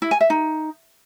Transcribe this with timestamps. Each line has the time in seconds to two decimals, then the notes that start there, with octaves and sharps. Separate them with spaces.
0.02 E4
0.11 G#5
0.21 E5
0.30 D#4